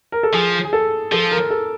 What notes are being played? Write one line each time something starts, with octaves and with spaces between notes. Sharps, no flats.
A#4
A4
F3 G#4
G#4
A4
F3 A4
A#4
A4